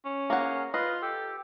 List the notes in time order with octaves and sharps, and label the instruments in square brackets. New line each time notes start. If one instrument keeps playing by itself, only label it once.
[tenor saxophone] C#4
[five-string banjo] A#3 F#5 [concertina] G#4 F5 A#5
[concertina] F4 F5 C6 [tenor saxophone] B4 [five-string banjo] D#5
[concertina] G4 [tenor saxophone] A4